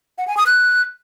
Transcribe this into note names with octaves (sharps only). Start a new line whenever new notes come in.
F#5
G#5
D#6
F#6